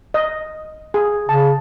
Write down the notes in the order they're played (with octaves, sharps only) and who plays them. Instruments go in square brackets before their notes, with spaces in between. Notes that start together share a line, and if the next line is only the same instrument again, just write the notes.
[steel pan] D#5
G#4
[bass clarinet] C#3 [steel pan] A5